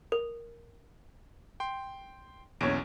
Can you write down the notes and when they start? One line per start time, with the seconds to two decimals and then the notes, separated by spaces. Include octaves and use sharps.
0.12 A#4
1.60 G5 C6
2.61 B1 E2 C#4 C#5 D7